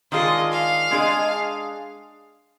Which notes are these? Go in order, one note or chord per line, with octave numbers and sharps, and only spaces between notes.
D#3 G#3 D4 F4 G#4 D#5
F5
G#3 D4 G#4 D#5